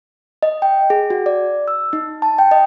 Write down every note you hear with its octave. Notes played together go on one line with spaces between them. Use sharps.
D#5
G5
G#4
F#4
D5
E6
D#4
A5
G5
D#5